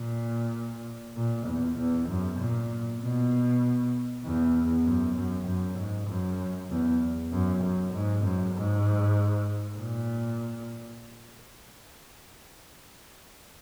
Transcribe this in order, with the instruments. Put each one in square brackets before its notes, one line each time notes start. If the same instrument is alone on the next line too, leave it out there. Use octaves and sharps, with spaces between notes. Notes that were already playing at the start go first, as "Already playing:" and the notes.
Already playing: [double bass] A#2
A#2
E2
E2
F#2
A#2
B2
E2
F#2
F#2
F#2
G#2
F#2
E2
F#2
F#2
G#2
F#2
G#2
A#2